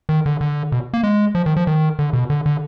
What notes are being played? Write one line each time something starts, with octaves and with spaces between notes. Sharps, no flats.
D#3
D3
D3
B2
A#3
G#3
F3
D#3
F3
D#3
D3
B2
D3
D3